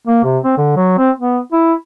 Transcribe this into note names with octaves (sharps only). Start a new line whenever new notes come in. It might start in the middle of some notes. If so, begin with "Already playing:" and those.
A#3
C3
C4
D3
F#3
C4
B3
E4